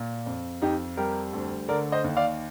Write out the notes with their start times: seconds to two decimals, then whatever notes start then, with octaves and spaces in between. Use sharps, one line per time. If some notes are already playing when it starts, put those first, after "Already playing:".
Already playing: A#2
0.26 F2
0.62 F2 D#4 G4
0.97 G3 G4 A#4
1.33 D2
1.68 D3 A#4 D5
1.92 C5 D#5
2.04 D#2
2.17 D5 F5